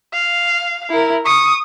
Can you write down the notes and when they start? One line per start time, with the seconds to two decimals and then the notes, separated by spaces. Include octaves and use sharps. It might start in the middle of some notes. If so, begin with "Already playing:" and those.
0.13 F5
0.90 E4 A#4
1.25 C#6 D#6